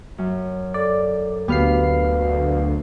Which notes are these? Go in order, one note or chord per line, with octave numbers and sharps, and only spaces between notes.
F#2
A4 D5
D2 B3 F#4 G4 B4 F5 F6 C7